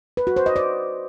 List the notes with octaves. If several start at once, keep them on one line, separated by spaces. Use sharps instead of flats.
B4
F#4
C5
D#5
D5